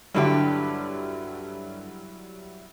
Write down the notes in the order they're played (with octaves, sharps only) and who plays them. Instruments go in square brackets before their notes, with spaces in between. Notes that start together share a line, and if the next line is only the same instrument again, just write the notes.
[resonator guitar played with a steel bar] G2 D3 G4 [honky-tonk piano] F#3 G3 E4